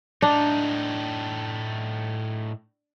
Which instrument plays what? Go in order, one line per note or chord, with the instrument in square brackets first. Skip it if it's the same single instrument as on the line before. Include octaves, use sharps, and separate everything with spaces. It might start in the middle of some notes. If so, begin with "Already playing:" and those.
[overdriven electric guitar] A2 D#4 [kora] D4